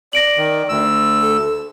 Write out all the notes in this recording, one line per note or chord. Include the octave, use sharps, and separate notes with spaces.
D5 A#6 D7 F#7
D#3
D2 E6
A4